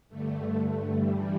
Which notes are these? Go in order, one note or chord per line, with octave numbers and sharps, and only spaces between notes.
G2 D3 A3
G2 E3 G3